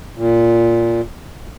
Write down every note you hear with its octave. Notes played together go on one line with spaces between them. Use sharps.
A#2